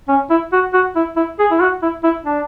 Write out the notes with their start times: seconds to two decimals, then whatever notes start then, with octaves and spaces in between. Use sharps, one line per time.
0.08 C#4
0.30 E4
0.52 F#4
0.73 F#4
0.96 E4
1.16 E4
1.39 G#4
1.51 E4
1.60 F#4
1.82 E4
2.03 E4
2.26 D4